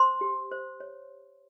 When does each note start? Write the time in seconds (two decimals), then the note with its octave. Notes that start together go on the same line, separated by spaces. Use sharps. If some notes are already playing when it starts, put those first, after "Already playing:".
Already playing: C5 C6
0.21 G4
0.51 C5
0.80 C#5